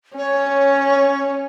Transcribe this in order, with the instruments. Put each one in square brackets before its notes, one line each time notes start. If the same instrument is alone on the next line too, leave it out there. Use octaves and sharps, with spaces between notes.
[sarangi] C#4 [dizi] C#5